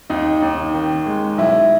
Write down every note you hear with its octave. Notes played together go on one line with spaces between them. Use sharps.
D#2 D#4
D#2
D#3
G#3
B1 E4